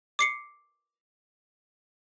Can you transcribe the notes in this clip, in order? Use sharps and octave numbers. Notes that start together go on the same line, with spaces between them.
D6 C7 C#7